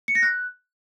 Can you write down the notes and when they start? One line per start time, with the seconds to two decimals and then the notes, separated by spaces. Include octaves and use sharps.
0.08 C#7
0.15 A#6
0.22 F#6